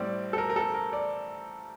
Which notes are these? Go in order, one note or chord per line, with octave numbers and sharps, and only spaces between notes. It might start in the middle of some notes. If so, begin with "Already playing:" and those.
Already playing: A2 G3 C4 D5
A4
A#4
A#4
A4
A#4
D5